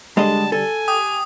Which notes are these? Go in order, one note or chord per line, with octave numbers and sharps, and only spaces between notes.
D3 G3 G#3 D#5 A5
A4 G#5
G4 D#6